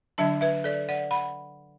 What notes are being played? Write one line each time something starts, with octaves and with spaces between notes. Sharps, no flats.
D3 F#3 D4 E5 A5
B4 E5
A4 D5
D5 F#5
F#5 B5